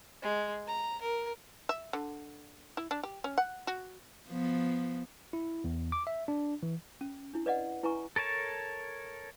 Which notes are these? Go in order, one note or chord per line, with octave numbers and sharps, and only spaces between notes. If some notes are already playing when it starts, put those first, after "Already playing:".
G#3
A#5
A#4
E5
D3
E4
D4
G4
C#4
F#5
F#4
F3 B3
E4
E2
D6
E5
D4
E3
C#4
D4 E4
B4 D5 D#5 F#5
E4 B4 G#5 A#5 C#6
A4 A#4 C#5 A5